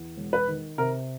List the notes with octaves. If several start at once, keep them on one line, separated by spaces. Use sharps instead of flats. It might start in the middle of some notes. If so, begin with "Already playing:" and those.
Already playing: E2
E1
B4
D#3
C3 A#4